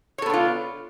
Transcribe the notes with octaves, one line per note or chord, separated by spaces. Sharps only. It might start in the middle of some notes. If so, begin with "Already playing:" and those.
B3 D4 F4 A4 C#5